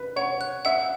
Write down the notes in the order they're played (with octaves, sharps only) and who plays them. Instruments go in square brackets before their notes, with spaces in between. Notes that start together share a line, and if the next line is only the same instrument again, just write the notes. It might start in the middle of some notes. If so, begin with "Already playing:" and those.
Already playing: [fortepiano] B4
[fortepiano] C#5 [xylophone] F#5
[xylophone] F#6
[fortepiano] E5 [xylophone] F#5